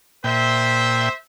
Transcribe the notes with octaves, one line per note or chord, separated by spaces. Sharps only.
A#2 C5 E5 G5